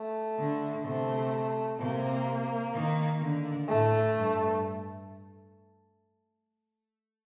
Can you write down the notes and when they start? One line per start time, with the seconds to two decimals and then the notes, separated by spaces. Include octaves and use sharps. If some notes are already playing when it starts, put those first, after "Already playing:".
Already playing: A3
0.39 D3
0.85 C3 A3
1.80 C3 A#3
2.74 D#3
3.21 D3
3.68 A2 A3
4.16 G2